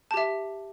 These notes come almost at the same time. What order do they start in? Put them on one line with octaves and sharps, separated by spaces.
A5 G4 E5